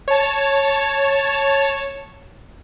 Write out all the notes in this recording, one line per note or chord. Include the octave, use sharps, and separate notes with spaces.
C#5 A5